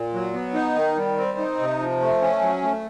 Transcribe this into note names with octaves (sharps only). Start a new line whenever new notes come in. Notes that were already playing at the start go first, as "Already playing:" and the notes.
Already playing: A#2
F#3
B3
D#4
D#3
G3
C4
D#4
C3
F3
A3
C#4
F#3
A3